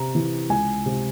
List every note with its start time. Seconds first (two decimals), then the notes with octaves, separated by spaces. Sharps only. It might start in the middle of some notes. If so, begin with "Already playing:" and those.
Already playing: C3 A#5
0.15 E3
0.50 C#2 G#5
0.86 C3